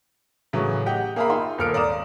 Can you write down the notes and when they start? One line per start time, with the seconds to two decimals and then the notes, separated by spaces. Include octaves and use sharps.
0.53 A2 C#3 E3 F#3
0.86 G4 D#5 F#5 G5
1.16 A#3 G#4 E5 F5 A#5 B5
1.30 D#4 F4 E5 G5 C6
1.58 D#1 A#3 A4 F6 C#7 D7
1.73 G#1 D5 A#5 D#6 E7